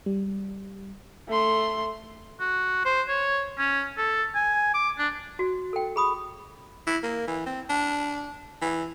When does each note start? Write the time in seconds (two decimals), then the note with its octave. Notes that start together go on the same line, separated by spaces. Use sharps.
0.06 G3
1.28 A3 C6
2.41 F#4
2.85 C5
3.09 C#5
3.59 C#4
3.98 A4
4.35 G#5
4.74 D6
4.98 D4
5.39 F#4
5.73 A4 G5
5.96 G#4 B5 D#6
6.87 E4
7.03 A#3
7.27 E3
7.46 C4
7.70 D4
8.62 E3